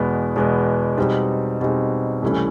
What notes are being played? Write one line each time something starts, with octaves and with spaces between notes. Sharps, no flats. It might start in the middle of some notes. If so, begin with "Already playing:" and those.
Already playing: E2 B2 G#3 B3
E2 B2 G#3 B3
B2 G3 C4 D#4 G#4
B2 G3 C4 D#4 G#4
C2 C3 E3 A3 C#4